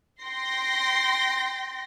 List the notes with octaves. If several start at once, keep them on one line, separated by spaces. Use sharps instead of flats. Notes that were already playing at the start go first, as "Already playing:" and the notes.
G5 C6 A#6